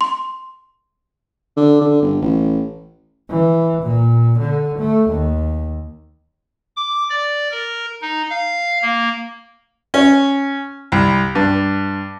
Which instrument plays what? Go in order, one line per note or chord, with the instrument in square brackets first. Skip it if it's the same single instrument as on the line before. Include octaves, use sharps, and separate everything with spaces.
[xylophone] C6
[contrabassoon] D3
D3
G1
A1
[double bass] E3
A#2
D3
A3
D#2
[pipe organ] D6
D5
A#4
D#4
F5
A#3
[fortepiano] C#4
C2
G2